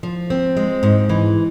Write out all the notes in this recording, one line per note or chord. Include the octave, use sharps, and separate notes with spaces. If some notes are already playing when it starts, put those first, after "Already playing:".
F3
C4
G#3
G#2
E3